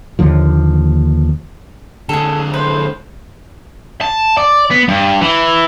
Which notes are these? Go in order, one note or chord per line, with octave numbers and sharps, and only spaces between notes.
D#2 D3 F3
D3 G#3 G#4 A4
A2 B4 C5
A5
D5
B3
G2
E3